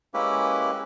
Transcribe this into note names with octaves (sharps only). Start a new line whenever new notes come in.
G#3 A#3 C#4 E4 G4 B4